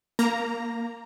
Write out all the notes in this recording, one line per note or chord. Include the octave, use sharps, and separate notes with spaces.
A#3 A#5